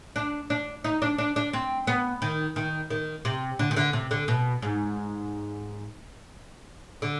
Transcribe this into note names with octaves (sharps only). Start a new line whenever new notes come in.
D4
D4
D#4
D4
D4
D4
C4
B3
D#3
D#3
D#3
C3
D3
D#3
D3
C3
D3
B2
G#2
D3